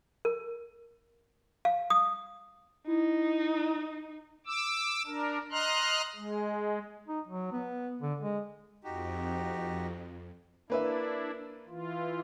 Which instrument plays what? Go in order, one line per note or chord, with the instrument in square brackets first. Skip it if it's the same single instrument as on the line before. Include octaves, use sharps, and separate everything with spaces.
[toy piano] A#4
F5
D#6
[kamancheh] D#4 [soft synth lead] E4
[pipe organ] D6 E6
D4 A#4
D#5 A#5 C6 F6 F#6
G#3
[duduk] D#4
F#3
B3
D3
G#3
[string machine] F2 [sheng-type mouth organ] D#4 F#4 G4
[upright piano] A#3 B4 E5 [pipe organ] D4 E4
[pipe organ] E3 F4